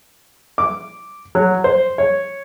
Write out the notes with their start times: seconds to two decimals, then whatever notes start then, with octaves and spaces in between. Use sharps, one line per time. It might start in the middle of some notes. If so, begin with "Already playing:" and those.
0.58 D6
1.35 F#3
1.64 C5
1.98 C#5